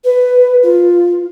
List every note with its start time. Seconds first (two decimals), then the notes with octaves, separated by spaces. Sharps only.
0.04 B4
0.63 F4